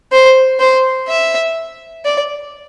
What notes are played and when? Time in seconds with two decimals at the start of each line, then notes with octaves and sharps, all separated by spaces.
0.12 C5
0.60 C5
1.08 E5
2.05 D5